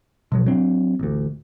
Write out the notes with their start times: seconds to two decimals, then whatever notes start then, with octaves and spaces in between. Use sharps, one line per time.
0.32 B2 F3 F#3
0.46 F#3 C4 D4
0.99 A1 D2